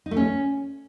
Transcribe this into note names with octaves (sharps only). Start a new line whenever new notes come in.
D#4
A3
C#4